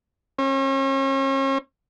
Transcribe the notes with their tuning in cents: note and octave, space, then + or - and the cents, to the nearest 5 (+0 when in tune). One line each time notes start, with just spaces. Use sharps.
C#4 -40